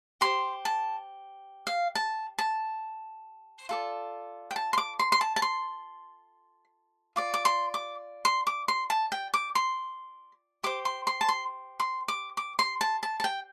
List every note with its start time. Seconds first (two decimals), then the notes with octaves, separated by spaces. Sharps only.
0.21 G4 C5 C6
0.65 A5
1.67 F5
1.95 A5
2.38 A5
3.69 F4 A4 D5
4.51 G5
4.56 A5
4.73 C6
4.78 D6
4.99 C6
5.12 C6
5.21 A5
5.36 A5
5.42 C6
7.16 F4 D5 D6
7.34 D6
7.45 C6
7.74 D6
8.25 C6
8.47 D6
8.68 C6
8.90 A5
9.12 G5
9.34 D6
9.55 C6
10.63 G4 C5 D6
10.85 C6
11.07 C6
11.21 A5
11.29 C6
11.80 C6
12.08 D6
12.37 D6
12.59 C6
12.81 A5
13.03 A5
13.20 A5
13.24 G5